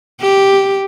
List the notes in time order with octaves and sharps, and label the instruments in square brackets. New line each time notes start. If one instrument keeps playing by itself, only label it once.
[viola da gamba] G4